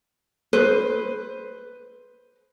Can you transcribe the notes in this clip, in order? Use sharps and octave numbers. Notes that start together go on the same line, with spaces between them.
B4 C5